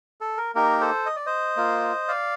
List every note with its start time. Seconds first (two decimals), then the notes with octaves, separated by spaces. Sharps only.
0.21 A4
0.37 A#4
0.55 A#3 D#4 G4 A#4
0.81 A4 C5
1.06 D#5
1.16 D5
1.26 C5 D#5
1.56 A#3 F4
2.08 D5 F5